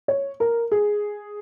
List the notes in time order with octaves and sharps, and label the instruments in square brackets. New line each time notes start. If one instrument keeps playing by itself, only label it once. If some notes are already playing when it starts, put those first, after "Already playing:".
[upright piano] C#5
A#4
G#4